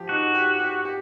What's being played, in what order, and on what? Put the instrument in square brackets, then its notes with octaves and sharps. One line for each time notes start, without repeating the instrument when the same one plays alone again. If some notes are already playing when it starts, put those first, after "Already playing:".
Already playing: [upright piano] F3 G4
[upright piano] D#4 [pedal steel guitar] F#4
[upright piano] G4
G4
G4